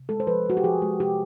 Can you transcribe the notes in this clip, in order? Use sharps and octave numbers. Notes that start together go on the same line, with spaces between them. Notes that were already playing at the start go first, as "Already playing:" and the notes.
Already playing: C3
G#3 A4
C5
F3 B4
G#3 F#4
G4
F3 G#4
G#3
C3 G4